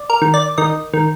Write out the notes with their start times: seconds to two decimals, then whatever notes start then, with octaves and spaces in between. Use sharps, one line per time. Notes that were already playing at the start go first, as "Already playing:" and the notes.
Already playing: D5
0.10 A#4
0.22 D#3
0.34 D5
0.58 D#3 D#5
0.94 D#3